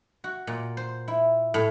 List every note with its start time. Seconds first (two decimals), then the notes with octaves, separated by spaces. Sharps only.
0.24 F#4
0.47 A#2
0.77 C5
1.08 E4
1.54 A2